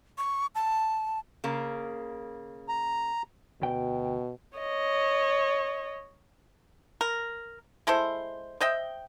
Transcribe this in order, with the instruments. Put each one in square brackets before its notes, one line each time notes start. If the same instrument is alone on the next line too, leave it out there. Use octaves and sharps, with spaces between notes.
[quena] C#6
A5
[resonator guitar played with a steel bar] C#3 A#3
[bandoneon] A#5
[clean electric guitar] D2 G5 [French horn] B2
[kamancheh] C#5 D#5
[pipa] A#4
G#3 E4 A4 C5
C5 D#5 E5 G5